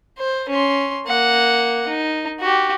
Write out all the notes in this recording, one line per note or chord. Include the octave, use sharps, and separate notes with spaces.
C5
C#4 C6
A#3 F#5
D#4
F#4 G4